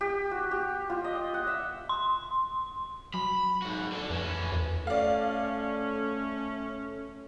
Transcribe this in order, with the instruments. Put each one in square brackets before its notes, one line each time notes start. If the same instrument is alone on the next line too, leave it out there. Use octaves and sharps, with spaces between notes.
[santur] G4
F#4
G4
F4
D#5
F#5
E5
[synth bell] C6
[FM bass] F#3 [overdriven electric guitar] B5
[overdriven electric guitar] G#2 F#4
D3 A4
[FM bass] F2 [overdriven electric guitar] E3 C#4
[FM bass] E2
[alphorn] A3 [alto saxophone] C#4 [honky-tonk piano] D5 F5